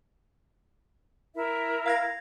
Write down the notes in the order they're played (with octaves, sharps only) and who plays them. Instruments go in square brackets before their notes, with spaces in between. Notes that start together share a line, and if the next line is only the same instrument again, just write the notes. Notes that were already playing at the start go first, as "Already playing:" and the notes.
[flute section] E4 A#4 E5
[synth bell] F5 G#6 A#6